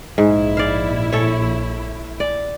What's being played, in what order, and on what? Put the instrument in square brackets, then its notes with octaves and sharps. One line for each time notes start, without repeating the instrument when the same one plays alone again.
[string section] A#1 E4 [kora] G#2
[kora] D5 F5
A4 C#5
D5